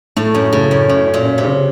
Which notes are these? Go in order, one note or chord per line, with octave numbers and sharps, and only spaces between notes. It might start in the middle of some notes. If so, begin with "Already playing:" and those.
A2 A3
F#2 C#4
A2 C#3
F#2 C#4
A2 C#4
C#4
A#2
C#4
C3
C#3